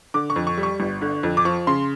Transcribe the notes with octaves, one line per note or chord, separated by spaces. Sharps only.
D3 D6
C#6
F2
C#6
G3
C#6
G1
D3
F2
D6
F3 C#6
C#3 C6